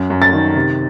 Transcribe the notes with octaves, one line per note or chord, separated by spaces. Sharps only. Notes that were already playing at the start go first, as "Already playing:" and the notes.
Already playing: F#2
F#2
A6
D#3
C3